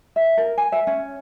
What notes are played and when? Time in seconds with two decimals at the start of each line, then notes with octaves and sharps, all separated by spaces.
0.16 E5
0.37 A#4
0.58 G#5
0.72 E5
0.87 C#4